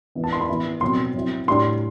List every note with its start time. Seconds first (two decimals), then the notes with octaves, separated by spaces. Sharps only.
0.15 E3 B3 E4
0.24 A5
0.33 C6
0.41 B5
0.49 E3 B3 E4
0.81 B2 F#3 C4 C6
1.14 F#3 C4 E4
1.47 A2 G3 D4 C6